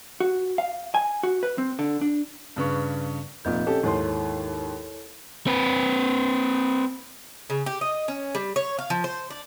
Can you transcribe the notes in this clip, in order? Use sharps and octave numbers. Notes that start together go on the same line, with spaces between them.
F#4
F5
G#5
F#4
B4
C4
D3
D4
G2 C#3 B4 C#6
F1 A#2 C4 D#5 G6
C#4 G4 A4
D#2 G#2 E4 A4 C#5 C6
C4 B4
C#3
G4
D#5
C#4
G3
C#5
F5
F3
C5
D4